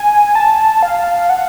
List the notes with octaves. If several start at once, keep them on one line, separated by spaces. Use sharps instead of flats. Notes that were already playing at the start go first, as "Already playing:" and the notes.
Already playing: G#5
A5
F5
F#5